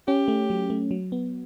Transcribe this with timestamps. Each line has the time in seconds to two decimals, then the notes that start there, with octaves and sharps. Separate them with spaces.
0.08 C#4 G4
0.28 A3
0.50 F#3
0.70 A3
0.91 F#3
1.12 B3